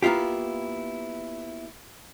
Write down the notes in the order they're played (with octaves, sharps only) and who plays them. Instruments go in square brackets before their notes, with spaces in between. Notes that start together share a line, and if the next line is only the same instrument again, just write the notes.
[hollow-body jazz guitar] A#3 B3 E4 F4 G4